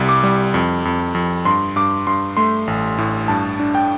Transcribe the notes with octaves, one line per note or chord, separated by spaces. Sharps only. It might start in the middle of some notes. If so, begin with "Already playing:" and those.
Already playing: C2 G3
D6
G3
F2
F2
F2
G2 C6
G2 D6
G2 C6
A3 C6
A1
A2
G2 A5
D4
G5